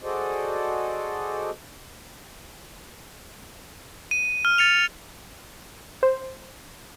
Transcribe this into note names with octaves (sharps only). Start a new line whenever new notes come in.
F#4 G#4 A4 C5 D5 D#5
D#7
F6
A6 C#7 F7
C5